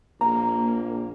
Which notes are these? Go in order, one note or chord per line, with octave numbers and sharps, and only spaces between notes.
A#1 A#3 A#5